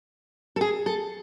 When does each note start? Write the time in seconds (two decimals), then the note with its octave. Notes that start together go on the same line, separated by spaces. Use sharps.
0.56 A4
0.61 G#4
0.86 A4